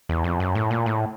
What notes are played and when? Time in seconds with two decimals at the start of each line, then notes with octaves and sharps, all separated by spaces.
0.09 E2
0.24 F2
0.40 F#2
0.55 A2
0.71 A#2
0.86 A2